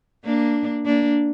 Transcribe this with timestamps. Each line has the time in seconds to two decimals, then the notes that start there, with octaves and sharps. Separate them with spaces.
0.24 A#3 D4
0.86 A#3 D4